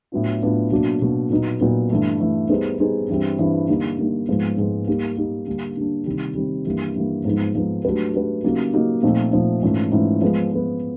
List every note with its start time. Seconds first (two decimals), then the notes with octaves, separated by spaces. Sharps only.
0.12 A2 F#3 B3 D4 F4
0.42 A2 F#3 B3 D4 F4
0.72 B2 F#3 A#3 D4
1.02 B2 F#3 A#3 D4
1.30 A#2 F#3 B3 D#4
1.61 A#2 F#3 B3 D#4
1.90 G2 E3 A3
2.20 G2 E3 A3
2.49 G3 B3 D#4 G#4 C5
2.79 G3 B3 D#4 G#4 C5
3.09 G2 E3 G3 C4
3.39 G2 E3 G3 C4
3.68 D3 G3 A#3 D#4
3.98 D3 G3 A#3 D#4
4.29 G#2 F3 G#3 B3
4.58 G#2 F3 G#3 B3
4.87 G3 A#3 D#4 G4
5.17 G3 A#3 D#4 G4
5.47 D3 G3 A#3 D4
5.77 D3 G3 A#3 D4
6.06 C3 D#3 G3
6.35 C3 D#3 G3
6.66 G2 E3 G3 A#3
6.95 G2 E3 G3 A#3
7.25 G#2 F3 G#3 B3 D#4
7.55 G#2 F3 G#3 B3 D#4
7.85 F#3 A3 D4 G4 B4
8.14 F#3 A3 D4 G4 B4
8.44 C#3 F#3 A#3 D#4 G4
8.74 C#3 F#3 A#3 D#4 G4
9.03 A#2 F3 A3 C4 D#4
9.32 A#2 F3 A3 C4 D#4
9.63 G#2 E3 A3 C#4 F4
9.92 G#2 E3 A3 C#4 F4
10.22 F3 G#3 B3
10.52 F3 G#3 B3